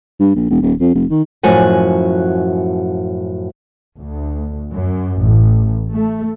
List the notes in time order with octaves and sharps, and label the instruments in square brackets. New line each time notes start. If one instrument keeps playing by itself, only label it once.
[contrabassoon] G2
A#1
E1
D#1
F2
F1
D#3
[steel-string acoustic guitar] F#2 A2 F3 F#4 F#5 G#5
[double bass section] D2
F#2
A1
A3